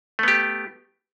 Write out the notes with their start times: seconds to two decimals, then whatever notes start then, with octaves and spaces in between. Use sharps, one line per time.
0.19 A3
0.23 B3
0.28 G4